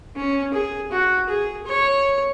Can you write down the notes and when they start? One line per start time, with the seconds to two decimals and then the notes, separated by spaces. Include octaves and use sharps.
0.16 C#4
0.53 G#4
0.92 F#4
1.29 G#4
1.67 C#5